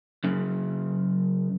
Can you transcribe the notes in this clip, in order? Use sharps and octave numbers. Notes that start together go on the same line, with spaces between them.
F#2 C#3